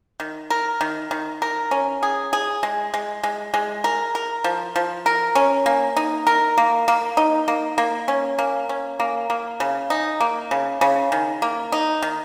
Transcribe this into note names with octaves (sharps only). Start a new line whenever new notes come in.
D#3
A#4
D#3
D#3
A#4
C#4
G#4
G#4
G#3
G#3
G#3
G#3
A#4
A#4
F3
F3
A#4
C#4
A#3
D#4
A#4
A#3
A#3
D#4
A#3
A#3
C#4
A#3
C#4
A#3
A#3
C#3
D#4
A#3
C#3
C#3
D#3
A#3
D#4
D#3